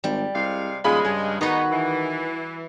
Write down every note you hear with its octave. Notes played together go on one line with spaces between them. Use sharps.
G#1 G3
C2 C3 G#3 F5
D#1 C#3 G#3 F4 G#4 B5
G2 G#4
D#3 B3 D#4 F#4 B4
E3